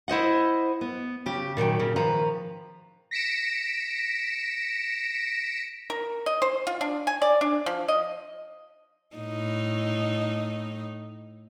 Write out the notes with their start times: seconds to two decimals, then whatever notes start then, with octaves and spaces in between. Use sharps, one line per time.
0.08 E4 C5 D#5 F#5
0.81 B3
1.26 C#3 G4
1.57 A#2 D#3 F#3 G5
1.79 A#2 C#3
1.96 D#3 F3 B4 A#5
3.11 A#6 B6 C#7 D7 E7
5.90 A#4
6.26 D#5
6.42 C5
6.67 F4
6.81 D4
7.07 G#5
7.22 D5
7.41 D4
7.66 F3
7.88 D#5
9.16 A2 D#4